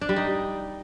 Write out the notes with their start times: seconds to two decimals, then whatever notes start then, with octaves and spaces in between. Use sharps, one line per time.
0.01 D4
0.09 G3
0.16 D#4